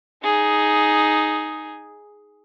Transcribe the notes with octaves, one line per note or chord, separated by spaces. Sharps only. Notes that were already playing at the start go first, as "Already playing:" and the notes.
D#4 G#4